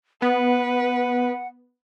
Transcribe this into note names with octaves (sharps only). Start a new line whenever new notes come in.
B3 B4 F#5